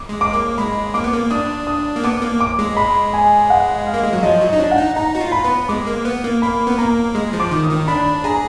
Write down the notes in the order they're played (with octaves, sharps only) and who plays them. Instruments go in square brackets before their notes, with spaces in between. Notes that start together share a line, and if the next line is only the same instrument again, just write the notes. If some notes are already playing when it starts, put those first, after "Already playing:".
Already playing: [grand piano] D6
[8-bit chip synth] G#3
[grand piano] D6
[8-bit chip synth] A#3
[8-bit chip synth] G#3 [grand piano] B5
[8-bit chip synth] A#3 [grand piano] D6
[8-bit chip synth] B3
A#3
[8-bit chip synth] D4 [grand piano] D#6
[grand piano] D#6
[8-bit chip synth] A#3
[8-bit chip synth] B3 [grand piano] D6
[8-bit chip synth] A#3
[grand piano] D6
[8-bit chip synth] G#3
[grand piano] B5
G#5
F#5
F5
[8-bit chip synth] A#3
G#3
F#3
[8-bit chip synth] F3 [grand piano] D#5
[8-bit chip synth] F#3
[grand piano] D#5
[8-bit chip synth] D#4
D4
[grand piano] F#5
[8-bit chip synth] D#4
[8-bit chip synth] D#4 [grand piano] A#5
[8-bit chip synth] F#4
F4
[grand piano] B5
[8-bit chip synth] B3
[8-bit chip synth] G#3 [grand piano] D6
[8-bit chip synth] A#3
B3
A#3
[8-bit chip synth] A#3 [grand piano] B5
[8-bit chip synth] B3
[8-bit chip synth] A#3 [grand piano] A#5
[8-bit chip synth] G#3
F3
[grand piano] D6
[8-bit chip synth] D#3
[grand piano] D#6
[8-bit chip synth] D#3
[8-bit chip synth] D4 [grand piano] B5
[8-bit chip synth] G#4 [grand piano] A#5